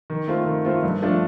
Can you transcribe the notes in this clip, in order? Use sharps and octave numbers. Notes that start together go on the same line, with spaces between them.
D#3
A3 C4 F4
D#3
A3 C4 F4
G2
F3 A3 D4 F4